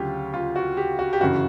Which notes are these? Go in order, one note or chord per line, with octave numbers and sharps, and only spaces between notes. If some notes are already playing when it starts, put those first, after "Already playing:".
Already playing: D2 C#3 F#3 F4 G4
F4
F#4
G4
F#4
G4
G1 F#2 C#3 E3 F#4